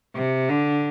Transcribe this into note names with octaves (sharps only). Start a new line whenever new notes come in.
C3
D3